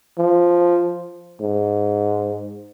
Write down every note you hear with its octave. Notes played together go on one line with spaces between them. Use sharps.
F3
G#2